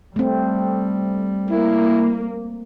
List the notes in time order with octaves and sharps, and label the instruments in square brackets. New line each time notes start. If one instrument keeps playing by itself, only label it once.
[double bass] G3 [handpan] A3 C4
[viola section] A#3 [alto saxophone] E4